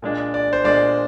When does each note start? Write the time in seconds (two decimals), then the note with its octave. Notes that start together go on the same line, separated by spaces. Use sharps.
0.02 A#2 G#3 D4
0.34 D5
0.53 C5
0.64 A#2 G#3 D4 D5